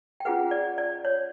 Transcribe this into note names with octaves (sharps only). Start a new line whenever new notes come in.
G5
C#4 F4 G#4 B4 F#5
D5
D5
C#5